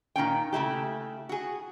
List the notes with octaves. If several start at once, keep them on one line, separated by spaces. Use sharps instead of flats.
A#2 D#3 C#4 G5
C#3 A3 E4 G4
F#4 G#4